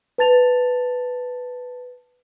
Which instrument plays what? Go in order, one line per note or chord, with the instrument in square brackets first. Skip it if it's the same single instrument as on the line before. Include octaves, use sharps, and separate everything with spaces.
[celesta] B4 A5 A6 F7